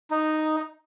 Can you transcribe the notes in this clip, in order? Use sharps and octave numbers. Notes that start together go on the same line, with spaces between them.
D#4